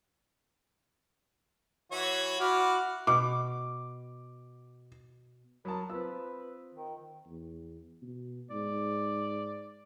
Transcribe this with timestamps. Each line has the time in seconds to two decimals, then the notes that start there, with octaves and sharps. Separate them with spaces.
1.92 E3 F#4 C#5
2.40 E4 F#4 D6 F6
3.07 B2 D6
5.65 F#3 A#4 A5 B5 D#6
5.90 C4 F4 B4 E6
6.74 D#3
7.27 E2
8.02 B2
8.51 G#2 D5